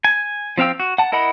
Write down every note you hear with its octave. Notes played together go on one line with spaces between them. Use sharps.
G#5
F3 C4 F5 G5 E6
F#4
F#5 A5
E4 A#4 D#5 F#5 B5